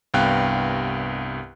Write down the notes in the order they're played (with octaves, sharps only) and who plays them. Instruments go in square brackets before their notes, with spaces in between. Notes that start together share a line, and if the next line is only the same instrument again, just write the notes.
[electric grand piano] C2 G2 B3 F5 G5 F#6